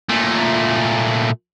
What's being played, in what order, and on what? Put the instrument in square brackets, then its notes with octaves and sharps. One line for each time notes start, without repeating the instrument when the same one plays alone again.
[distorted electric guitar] A#2 A3